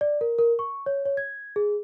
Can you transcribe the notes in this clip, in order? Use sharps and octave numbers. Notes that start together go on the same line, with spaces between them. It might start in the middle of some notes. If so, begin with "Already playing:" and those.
D5
A#4
A#4
C#6
C#5
C#5
G#6
G#4